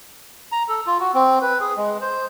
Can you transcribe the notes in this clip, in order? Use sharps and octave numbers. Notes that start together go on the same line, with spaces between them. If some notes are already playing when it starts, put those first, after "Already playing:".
A#5
A4
F4
F#4
C4
B4
G#4
G#3
C5